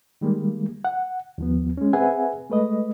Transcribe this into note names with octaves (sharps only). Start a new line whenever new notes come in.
D#3 G3 G#3 A#3
F#5
D#2 F3 B3
G#3 C#4
C4 G#4 B4 E5 F#5 G#5
G#3 A3 B4 D#5